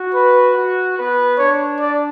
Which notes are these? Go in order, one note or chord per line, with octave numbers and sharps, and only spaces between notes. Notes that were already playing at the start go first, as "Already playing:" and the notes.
Already playing: F#4
B4
F#4
B3 B4
D4 C#5
D5